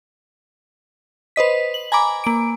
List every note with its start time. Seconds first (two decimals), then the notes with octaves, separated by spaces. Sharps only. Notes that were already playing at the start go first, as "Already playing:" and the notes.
1.36 B4 C5 D#5 B6
1.74 F#7
1.92 G#5 A#5 B5 D6
2.24 A#3 D7